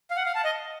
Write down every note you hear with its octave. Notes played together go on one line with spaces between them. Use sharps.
F5
F#5
F5
A5
D#5